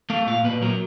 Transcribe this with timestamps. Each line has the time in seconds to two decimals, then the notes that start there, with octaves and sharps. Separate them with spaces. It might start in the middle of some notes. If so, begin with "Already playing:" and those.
0.10 A3 F5
0.26 A#2 F5
0.44 A#2 B4
0.62 F#3 A#4